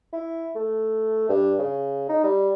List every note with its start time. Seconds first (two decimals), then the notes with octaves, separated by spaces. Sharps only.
0.13 E4
0.55 A3
1.29 G2
1.59 C#3
2.09 D#4
2.23 G3